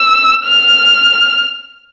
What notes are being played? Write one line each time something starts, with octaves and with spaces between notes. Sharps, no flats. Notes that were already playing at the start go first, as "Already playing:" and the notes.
Already playing: E6
F6